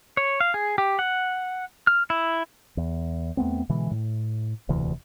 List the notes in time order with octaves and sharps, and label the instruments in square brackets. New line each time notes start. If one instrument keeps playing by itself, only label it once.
[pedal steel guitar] C#5
F5
G#4
G4
F#5
F6
E4
[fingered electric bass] E2
E2 A3 B3 C4
B2 D3 E3 G#3
A2
E1 D2 C3 E3